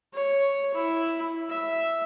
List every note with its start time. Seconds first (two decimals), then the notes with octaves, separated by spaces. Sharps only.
0.13 C#5
0.74 E4
1.49 E5